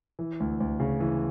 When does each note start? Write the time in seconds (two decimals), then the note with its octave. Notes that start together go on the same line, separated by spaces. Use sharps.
0.19 E3
0.40 D2
0.60 D2
0.80 C#3
1.00 E3